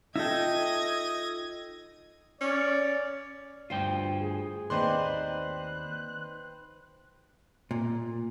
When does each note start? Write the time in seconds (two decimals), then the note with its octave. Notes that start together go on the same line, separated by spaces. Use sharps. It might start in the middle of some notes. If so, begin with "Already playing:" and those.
0.16 D#4 F4 A4 D#5 E5 G5 G#6 A#6
2.41 C#4 D5
3.70 D2 G2 F4 C5 G5
4.20 G#4
4.70 D#2 C4 D#4 B4 C5 D5 C6 F#6
7.71 A#2